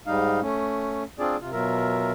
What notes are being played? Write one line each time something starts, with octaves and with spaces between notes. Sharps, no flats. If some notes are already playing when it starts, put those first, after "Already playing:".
G#2 G3 D#4 F5
A3 C#4
C4 D4 F4 G#4 D5
C3 F4
B2 F#3 F4 A#4 E5